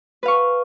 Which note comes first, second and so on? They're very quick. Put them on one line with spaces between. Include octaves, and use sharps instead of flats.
B4 F5 C#6